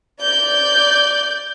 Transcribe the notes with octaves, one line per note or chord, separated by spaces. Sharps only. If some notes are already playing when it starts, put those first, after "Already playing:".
D5 G6